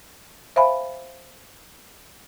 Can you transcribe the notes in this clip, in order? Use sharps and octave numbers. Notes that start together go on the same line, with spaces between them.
C5 E5 F5 G#5 B5